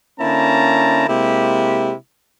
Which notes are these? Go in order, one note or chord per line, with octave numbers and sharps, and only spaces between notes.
D3 A#3 C#4 E4 A5 A#5
C3 G#3 A#3 E4 G4